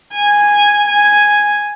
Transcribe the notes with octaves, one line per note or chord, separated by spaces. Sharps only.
G#5
G#5